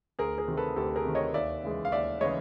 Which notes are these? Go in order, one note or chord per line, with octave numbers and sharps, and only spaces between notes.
D2 G#4 A#4
G#4 A#4
C3 D#3
A4 B4
D2 G4 A4
G#4 A#4
C3 D#3
C#5 D#5
D#2 D5 E5
C#3 E3 G#3
F5
D#2 D5 E5
C#3 E3 G#3 C#5 D#5